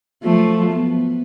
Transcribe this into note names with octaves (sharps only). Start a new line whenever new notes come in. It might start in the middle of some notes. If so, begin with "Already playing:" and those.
F3 F#3 A3
B3